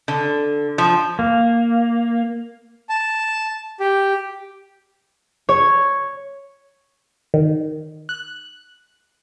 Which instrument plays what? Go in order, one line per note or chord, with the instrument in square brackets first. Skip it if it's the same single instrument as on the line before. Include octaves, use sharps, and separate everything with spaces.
[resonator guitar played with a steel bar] D3
F3
[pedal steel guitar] A#3
[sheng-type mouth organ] A5
G4
[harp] C#5
[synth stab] D#3
F#6